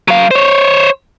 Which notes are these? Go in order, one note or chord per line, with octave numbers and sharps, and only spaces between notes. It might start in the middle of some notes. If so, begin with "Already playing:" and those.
F#3 F5
C5 C#5